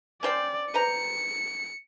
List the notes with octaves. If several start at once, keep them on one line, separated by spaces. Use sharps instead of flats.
C#4 C5 D5 G5
B4 C5 A#5 C#7